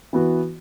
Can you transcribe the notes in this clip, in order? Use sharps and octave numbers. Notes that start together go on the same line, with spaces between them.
E3 B3 F#4